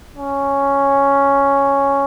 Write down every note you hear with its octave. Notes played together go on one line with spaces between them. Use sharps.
C#4